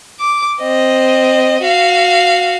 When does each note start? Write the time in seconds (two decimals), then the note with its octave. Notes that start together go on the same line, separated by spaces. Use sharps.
0.20 D6
0.62 C4 D#5
1.62 F#4 F5